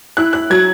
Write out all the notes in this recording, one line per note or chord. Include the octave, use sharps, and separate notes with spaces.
E4 F#6
F#6
F#3 G#6